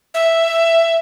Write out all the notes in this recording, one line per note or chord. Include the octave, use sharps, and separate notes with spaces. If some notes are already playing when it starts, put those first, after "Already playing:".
E5